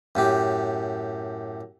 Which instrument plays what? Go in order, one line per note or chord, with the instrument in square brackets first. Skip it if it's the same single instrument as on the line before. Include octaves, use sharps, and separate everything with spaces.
[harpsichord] F#2 A2 G4